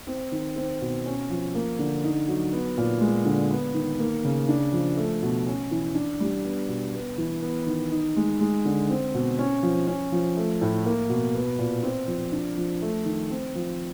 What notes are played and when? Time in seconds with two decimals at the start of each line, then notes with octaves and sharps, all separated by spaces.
0.07 C4
0.32 D#3
0.56 C4
0.81 B2
1.06 C#4
1.30 F3
1.54 A#3
1.79 D3
2.04 D#4
2.28 F#3
2.52 B3
2.77 A#2
3.01 G#3
3.25 D3
3.51 B3
3.74 D#3
3.99 A#3
4.24 C#3
4.48 D4
4.73 F3
4.97 A3
5.22 B2
5.47 C#4
5.71 E3
5.95 D4
6.20 G3
6.44 B3
6.68 B2
6.93 B3
7.18 E3
7.42 B3
7.67 D#3
7.92 D#4
8.16 G#3
8.40 G#3
8.65 D3
8.89 C4
9.14 B2
9.39 C#4
9.63 F3
9.87 C#4
10.12 F3
10.37 A3
10.61 A2
10.85 A#3
11.09 B2
11.34 B3
11.59 A#2
11.83 C4
12.07 F3
12.32 D4
12.57 F3
12.82 A3
13.05 D#3
13.30 C4
13.55 F3